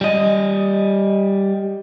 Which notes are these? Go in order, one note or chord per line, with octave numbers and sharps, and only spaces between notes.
G3 D#5